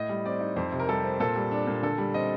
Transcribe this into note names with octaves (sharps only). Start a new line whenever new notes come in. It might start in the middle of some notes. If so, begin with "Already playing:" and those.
Already playing: A2 D#5
G3
C4 D5
D#4
F2 C5
C3
A#4
G3 A4
C4
A#2 A4
G3
D4
A#2
D3 A4
G3
C4 D#5